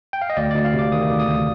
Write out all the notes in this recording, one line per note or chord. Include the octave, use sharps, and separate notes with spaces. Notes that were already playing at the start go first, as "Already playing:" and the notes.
G5
F5
D#5
D2 D5
D2 D5
F5
C3
D6
D#3 D#6
D2
D#6
D2